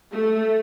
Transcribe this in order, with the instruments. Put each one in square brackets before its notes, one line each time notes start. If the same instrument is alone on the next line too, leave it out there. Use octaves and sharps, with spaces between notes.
[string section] A3